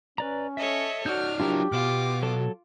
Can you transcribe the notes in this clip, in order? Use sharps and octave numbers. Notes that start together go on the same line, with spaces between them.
C#4 B4 D5 A#5
A4 C#5 D#5 E5
D#4 F#4 D5 F6 G6
F#3 D4 E4 F4 G4 A#4
B2 F4 D6 F6
F#3 A4